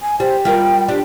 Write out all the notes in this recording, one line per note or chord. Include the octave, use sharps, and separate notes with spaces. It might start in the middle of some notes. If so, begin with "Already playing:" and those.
G#5
G3 C5
G3 F4 A#4 G5
D4 G4